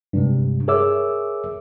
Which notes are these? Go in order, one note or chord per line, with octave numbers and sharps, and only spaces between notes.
G2 C3 G#3
G#4 A#4 C#5 E5 D6 E6